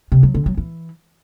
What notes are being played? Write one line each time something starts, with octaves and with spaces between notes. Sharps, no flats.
C3
F#3
D3
F#3
E3